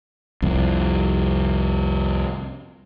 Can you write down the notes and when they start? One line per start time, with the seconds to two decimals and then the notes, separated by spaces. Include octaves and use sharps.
0.42 C2 F2